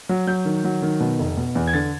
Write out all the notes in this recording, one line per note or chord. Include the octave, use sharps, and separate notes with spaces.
F#3
F#3 G6
D#3
F#3
D#3
B2
F1
B2
E2
G#6
D3 A6